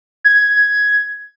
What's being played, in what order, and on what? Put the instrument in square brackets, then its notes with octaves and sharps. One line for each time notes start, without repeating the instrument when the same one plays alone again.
[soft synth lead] G#6